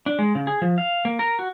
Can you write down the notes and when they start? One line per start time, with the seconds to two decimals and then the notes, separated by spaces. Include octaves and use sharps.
0.06 D4
0.19 G#3
0.35 C#3
0.47 G#4
0.62 F3
0.78 F5
1.05 A#3
1.19 A#4
1.39 F#4